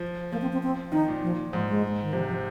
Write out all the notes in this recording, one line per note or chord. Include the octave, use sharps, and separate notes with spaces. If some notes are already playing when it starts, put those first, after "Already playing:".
Already playing: F3
F3 A#3
C4
C4
C4
D#3 D#4
A#2
F3
G#2 F3
G#3
D#3
C3 F3
F3